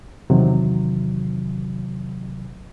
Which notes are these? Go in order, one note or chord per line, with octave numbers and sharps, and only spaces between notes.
E2 C3 D#3 F#3